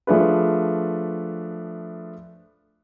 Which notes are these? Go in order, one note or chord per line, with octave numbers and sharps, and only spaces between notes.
F3 A3 D4 G#4 B4